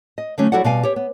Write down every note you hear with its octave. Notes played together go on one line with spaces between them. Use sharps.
D#5
D3 F#3 A3 C#4 D#4
F#3 E4 F#4 A4 D5 F#5
B2 G3 D5 D#5 F5 G#5
G4 C#5
B3